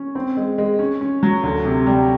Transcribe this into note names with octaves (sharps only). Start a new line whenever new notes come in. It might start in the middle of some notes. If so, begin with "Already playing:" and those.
Already playing: C#4
C4
G#3
G#3
C#4
C#4
F#3
D2
C3
G3